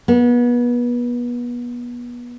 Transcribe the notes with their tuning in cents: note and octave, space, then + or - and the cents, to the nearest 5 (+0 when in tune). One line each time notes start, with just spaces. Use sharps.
B3 -30